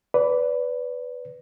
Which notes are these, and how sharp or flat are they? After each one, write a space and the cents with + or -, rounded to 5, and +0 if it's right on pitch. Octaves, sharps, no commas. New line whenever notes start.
B4 +10 D5 -25